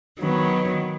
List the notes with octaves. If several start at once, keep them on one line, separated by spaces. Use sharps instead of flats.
D#3 F#3 B3